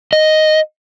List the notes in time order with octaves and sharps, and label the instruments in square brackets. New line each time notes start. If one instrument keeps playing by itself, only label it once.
[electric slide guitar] D#5